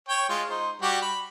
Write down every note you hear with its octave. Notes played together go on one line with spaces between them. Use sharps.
C#5 G5
G#3 F4
D#4 C5
G3 F#4 G4
B5